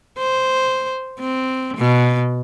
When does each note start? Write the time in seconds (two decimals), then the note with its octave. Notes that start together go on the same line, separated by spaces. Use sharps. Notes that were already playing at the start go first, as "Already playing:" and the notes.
0.18 C5
1.20 C4
1.77 B2